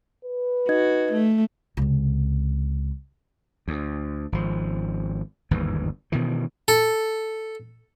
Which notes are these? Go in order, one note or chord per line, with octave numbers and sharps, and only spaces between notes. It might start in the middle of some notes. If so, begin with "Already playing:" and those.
B4
D#4 F#4 D#5 G#6
A3
C#2 C3
D2
G#1 F3
G1 D#2 G#2 E3
B2 D#3 E3
A4